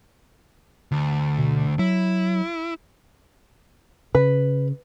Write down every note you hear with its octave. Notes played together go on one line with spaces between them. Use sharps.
D2
B2
F#3 E4
C#3 B4